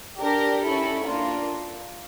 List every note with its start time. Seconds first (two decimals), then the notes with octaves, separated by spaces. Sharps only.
0.18 D4 G4 A#4
0.62 C#4 E4 A4
1.04 A#3 D4 F4